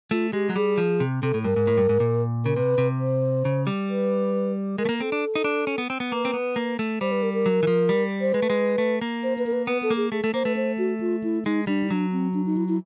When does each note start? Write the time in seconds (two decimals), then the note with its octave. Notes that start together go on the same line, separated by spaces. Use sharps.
0.11 A3 F4
0.33 G#3 G4
0.50 F#3
0.56 G3 G#4
0.78 F3
1.00 C3
1.23 C3 A4
1.34 A2
1.44 G2 A#4
1.56 G#2
1.67 A2
1.77 G2
1.89 G#2
2.00 A#2
2.45 C#3 A#4
2.56 C3 B4
2.78 C3
3.00 C5
3.45 C#3
3.67 G3
3.90 B4
4.78 G#3 A#4
4.85 A3
4.89 A#3
5.00 C4 A4
5.12 D4
5.35 D#4
5.44 D4
5.67 C#4
5.78 B3
5.90 C4
6.00 B3
6.11 A#3 B4
6.25 C4
6.34 B3
6.56 A#3
6.79 A3
7.01 G3 C5
7.11 B4
7.23 A#4
7.34 A#4
7.46 F#3
7.63 E3
7.67 F3
7.89 G3
8.21 C5
8.34 G#3 B4
8.42 A3
8.50 G#3
8.78 A3
9.01 A#3
9.23 C5
9.38 B4
9.47 A#4
9.53 B4
9.67 B3 B4
9.83 A4
9.90 A#3
9.97 G#4
10.12 A3 G#4
10.23 A3 A4
10.34 A#3 C5
10.45 A3 B4
10.56 C5
10.78 F#4
11.01 F4
11.24 E4
11.45 G#3 D#4
11.67 G3 D4
11.84 D#4
11.90 F#3 D4
12.13 C4
12.34 D4
12.46 D#4
12.57 E4
12.68 E4